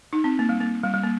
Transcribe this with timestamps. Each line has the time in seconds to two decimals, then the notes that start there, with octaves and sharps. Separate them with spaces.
0.13 D#4
0.24 C4
0.39 A#3
0.49 G3
0.60 A#3
0.84 G3
0.94 G3
1.03 A#3